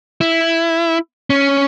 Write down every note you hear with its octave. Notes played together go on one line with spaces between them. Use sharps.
E4
C#4